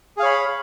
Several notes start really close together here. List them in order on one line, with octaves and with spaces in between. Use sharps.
G#4 F5 C#5 B5